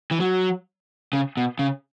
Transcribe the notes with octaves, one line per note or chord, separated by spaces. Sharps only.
E3
F#3
C#3
B2
C#3